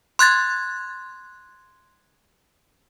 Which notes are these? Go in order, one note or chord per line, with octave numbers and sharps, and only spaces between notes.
C6 F#6 G#6 A6